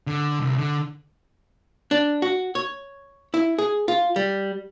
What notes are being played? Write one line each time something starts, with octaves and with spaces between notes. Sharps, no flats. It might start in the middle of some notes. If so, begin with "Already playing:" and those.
D3
C2
D3
D4
F#4
C#5
E4
G#4
F4
G3